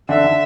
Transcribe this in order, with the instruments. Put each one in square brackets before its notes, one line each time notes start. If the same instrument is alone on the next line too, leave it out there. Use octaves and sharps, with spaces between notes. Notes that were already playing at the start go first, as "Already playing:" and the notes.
[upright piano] D3 [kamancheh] E5
[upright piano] D3